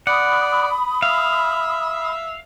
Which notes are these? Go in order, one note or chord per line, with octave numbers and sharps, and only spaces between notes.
D5 F#5 B5 D#6
E5 F5